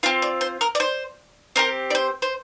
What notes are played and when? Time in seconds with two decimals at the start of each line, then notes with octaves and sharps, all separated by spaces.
0.03 C4 F4 F5
0.22 D5
0.41 C5
0.61 A#4
0.75 D5
0.80 C5
1.56 C4 G4 A#4
1.90 D5
1.95 C5
2.22 C5